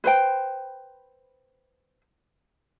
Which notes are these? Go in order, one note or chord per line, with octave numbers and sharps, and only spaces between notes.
B4 C5 G5